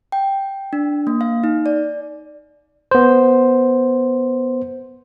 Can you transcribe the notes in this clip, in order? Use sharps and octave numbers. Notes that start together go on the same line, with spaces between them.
G5
D4
A#3
F5
D#4
D5
B3 C5